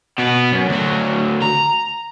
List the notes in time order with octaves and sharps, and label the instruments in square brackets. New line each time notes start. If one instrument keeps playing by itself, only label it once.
[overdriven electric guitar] B2 B3
F#2
D2 F#3
A#5